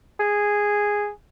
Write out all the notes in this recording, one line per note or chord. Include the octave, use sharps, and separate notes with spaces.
G#4